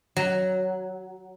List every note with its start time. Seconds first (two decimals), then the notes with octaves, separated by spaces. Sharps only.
0.16 F#3